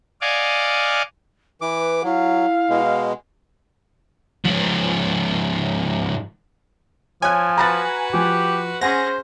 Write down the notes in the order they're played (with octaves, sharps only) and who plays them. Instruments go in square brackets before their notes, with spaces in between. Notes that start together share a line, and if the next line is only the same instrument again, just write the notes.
[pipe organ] D5 D#5 F5 F#5 G#5 D6
[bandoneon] E3 D6 [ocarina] B4
[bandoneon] F#3 [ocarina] E4 [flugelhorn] F5
[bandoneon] B2 G#3
[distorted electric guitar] G#2 F3
[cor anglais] F3 [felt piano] C#5 F#6 [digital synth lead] G#5
[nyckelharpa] F#4 B4 [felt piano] A#5 B5 A6
[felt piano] F3 [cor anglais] G4
[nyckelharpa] C#4 G#4 [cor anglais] C5 [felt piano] F#5 G#5 C6 [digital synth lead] A#6